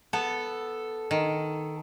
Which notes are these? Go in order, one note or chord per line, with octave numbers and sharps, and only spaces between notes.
B3 A4
D#3